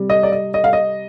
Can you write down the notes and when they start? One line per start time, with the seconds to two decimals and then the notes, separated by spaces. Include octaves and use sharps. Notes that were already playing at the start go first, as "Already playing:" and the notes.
Already playing: C3 G3
0.10 D#5
0.23 D5
0.32 D#5
0.54 D#5
0.64 F5
0.73 D#5